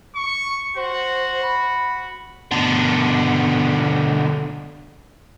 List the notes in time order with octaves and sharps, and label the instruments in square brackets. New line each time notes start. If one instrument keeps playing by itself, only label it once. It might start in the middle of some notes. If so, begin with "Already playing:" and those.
[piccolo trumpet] C#6
[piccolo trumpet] F#4 [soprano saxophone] C5
[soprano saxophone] B5
[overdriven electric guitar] B2 D3